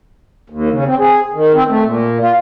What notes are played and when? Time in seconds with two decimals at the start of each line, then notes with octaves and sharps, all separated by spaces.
0.50 D#2
0.72 C#3
0.86 C4
0.99 G#4
1.34 D#3
1.54 C4
1.69 A3
1.84 A#2
2.20 F4